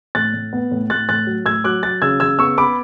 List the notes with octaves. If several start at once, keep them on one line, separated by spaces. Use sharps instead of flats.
A2 F#6 A6
A2
B3
A2
A2 F#6 A6
A2 F#6 A6
F#3
A2 E6 G#6
F#3 D6 F#6
F#3 F#6 A6
C#3 E6 G#6
C#3 E6 G#6
B3 C#6 E6
B3 B5 D6